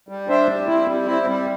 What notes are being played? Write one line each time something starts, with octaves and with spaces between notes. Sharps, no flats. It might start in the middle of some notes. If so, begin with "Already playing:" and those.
G3
D4 C5 E5
G3
C4 E4
G3
C4 E4
G3